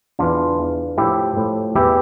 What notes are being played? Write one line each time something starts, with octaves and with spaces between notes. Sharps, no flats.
E2 E3 D4 F4
E2 E3
A2 F3 E4 G4
A2 F3
E2 E3 E4 G4